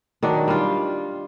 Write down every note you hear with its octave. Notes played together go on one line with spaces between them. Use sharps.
D#3 F#3 D4
G3 F4